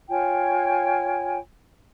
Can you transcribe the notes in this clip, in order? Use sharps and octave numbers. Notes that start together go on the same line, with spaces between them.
F4 C#5 G5 G#5